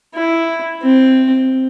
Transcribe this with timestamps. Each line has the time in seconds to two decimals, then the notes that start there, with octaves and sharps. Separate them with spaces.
0.15 E4
0.82 C4